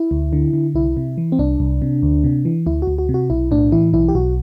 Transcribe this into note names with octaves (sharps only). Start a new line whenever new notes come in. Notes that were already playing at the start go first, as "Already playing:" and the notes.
Already playing: E4
D2
D3
D3
C2 E4
C3
E3
C4
C2 D4
C2
C3
D2
C3
E3
D2 E4
F#4
D2
F#4
C3
F#4
B1 E4
A2 D4
E3 E4
B1 E4
G4
B1 F#4